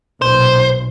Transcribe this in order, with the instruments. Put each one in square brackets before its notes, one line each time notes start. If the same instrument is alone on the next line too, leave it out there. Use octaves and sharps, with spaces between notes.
[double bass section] B1 A#2 [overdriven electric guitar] C5